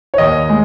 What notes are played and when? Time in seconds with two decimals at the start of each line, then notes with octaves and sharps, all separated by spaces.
0.14 C#5
0.18 D#2 D#5
0.50 G#3